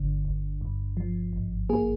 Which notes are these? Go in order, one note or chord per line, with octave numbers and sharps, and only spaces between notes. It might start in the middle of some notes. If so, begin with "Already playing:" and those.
Already playing: G1 D3
G1
G2
F3
G#1
A#3 G#4